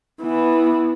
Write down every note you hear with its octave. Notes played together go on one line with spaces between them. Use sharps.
E3 B3